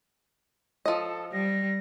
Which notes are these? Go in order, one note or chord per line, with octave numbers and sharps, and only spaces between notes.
F3 A4 D#5
G3 A#6